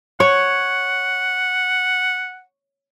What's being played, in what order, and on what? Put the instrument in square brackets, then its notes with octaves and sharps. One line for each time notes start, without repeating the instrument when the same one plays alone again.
[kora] C#5 [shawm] F#5